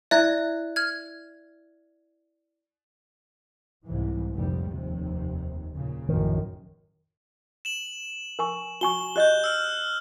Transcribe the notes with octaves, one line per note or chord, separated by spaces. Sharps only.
E4 D5 E5 F#6 G#6
F6 G#6
C2 G#2 E3
F1 A#2 G3
F1 D#2 C3
A#2 C#3
A#1 F#2 A2 D#3
E7 F#7
A#4 G#5 C#6
F#4 G#5 C#6 G7
G4 D5 D#5 F#6 G6
E6 F6